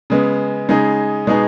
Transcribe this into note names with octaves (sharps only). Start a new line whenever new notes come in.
C#3 G#3 B3
C#3 G#3 D#4 G#4
B2 G#3 B3 D#4 G#4